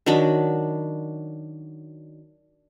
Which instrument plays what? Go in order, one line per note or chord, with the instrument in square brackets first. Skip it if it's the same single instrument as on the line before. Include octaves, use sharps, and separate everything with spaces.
[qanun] D#3 F#3 D4 B5